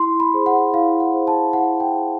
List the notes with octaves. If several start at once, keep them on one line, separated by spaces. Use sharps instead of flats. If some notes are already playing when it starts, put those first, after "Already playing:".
Already playing: E4 C6
B5
G#4 C5
F#5
E4 F5
F#5
G#4 C5
A5
E4 F#5
G5
G#4 C5